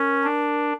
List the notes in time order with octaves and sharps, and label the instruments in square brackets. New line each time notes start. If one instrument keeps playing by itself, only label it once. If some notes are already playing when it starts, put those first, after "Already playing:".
Already playing: [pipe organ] C#4 [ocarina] A#4
[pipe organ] D4